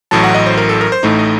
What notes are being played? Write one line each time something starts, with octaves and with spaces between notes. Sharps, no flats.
A1 A2 F#3 A5
F#5
D#5
C5
A#4
A4
A#4
C5
A1 A2 A3 D#4
D#5